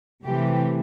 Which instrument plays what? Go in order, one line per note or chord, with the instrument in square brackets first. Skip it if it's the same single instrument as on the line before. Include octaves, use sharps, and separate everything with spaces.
[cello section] C3 E3 A3 G4